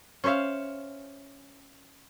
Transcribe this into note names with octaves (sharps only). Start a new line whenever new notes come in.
C#4 C5 C#5 E5 F5